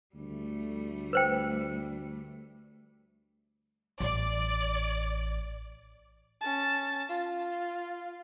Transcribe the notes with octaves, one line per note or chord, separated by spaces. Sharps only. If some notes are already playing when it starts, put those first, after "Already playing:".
D2 G3 A3
B4 C5 G5
A1 D5
C#4 A5
F4